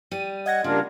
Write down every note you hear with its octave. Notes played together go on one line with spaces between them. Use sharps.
G3 D#7
D#5 F#5 G#6 A#6
C#3 G3 A#3 D4 F4